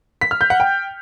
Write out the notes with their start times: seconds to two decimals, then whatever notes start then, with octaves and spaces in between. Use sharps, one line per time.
0.21 B6
0.31 F6
0.41 G6
0.50 F#5
0.60 G5